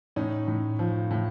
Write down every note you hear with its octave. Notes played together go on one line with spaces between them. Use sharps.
A2 C#4 D#4
A2
F3
A2